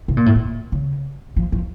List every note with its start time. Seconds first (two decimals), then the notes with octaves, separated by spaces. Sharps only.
0.08 C3
0.17 A#2
0.26 A2
0.35 A#2
0.72 C#3
1.36 F3
1.52 F3